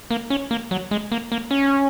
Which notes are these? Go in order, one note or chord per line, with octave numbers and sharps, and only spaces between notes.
A#3
C#4
A#3
F#3
G#3
A#3
A#3
C#4